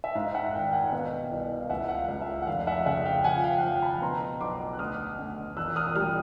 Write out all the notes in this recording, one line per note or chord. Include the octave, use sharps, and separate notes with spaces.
E5
G#2 F5
E5 F#5
G#1 F5 G5
G5
F#5 G#5
B2 F5 G5
C2
F5
C#2 E5 F#5
F#5
F5
C#2
E5
F#5
F1 F5
E5 F#5
C#3 E5 F#5
F5 G5
F3 F#5 G#5
F5 G5
F#5
F3 F5 G5
A5 B5
B2 A#5 C6
B1 C6 D6
F#6
D2 D#6 F6
D2
E1 E6 F#6
D#6 F6
G3 D#6 F6